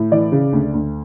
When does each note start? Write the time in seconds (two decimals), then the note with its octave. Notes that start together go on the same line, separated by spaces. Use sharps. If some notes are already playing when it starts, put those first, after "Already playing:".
Already playing: A2
0.11 E3 D5
0.32 C#3
0.53 D2
0.73 D2